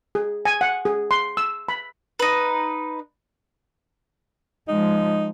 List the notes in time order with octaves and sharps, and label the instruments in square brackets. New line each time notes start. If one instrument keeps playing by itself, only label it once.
[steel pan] G#4
G#5
F#5
G#4
C6
E6
B5
[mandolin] D#4 B4
[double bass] F3 G#3 [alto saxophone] D#4